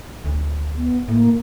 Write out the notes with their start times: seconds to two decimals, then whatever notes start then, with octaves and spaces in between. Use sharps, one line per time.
0.25 D2
0.76 B3
1.08 A2 A#3